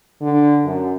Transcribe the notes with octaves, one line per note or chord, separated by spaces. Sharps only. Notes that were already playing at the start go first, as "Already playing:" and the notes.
D3
F#2